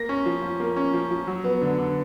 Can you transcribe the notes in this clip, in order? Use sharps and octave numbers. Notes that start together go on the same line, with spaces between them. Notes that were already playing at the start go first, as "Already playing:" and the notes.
Already playing: A#3 A#6
C#4
F3
F3
A#3
C#4
F3
F3
F#3
B3
D3
D3